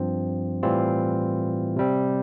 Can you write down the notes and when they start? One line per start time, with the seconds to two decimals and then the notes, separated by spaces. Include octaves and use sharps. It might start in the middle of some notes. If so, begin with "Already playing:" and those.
Already playing: G2 F3 C4
0.63 A2 E3 G3 C4 F4
1.76 C3 G3 C4